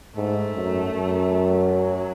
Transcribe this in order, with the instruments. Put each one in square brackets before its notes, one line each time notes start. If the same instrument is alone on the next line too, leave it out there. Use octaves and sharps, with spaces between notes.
[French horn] G#2 [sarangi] A3
[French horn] F#2
F#2
[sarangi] F#3